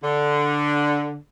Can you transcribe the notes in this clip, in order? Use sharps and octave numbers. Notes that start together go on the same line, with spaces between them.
D3